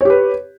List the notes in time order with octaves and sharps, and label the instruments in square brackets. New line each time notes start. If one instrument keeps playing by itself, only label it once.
[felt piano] C#5
G4
B4